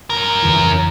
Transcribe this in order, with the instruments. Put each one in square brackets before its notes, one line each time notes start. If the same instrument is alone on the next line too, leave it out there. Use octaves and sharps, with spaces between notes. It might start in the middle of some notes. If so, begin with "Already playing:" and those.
[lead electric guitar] C#4 A#4
[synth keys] F2 C#3 E3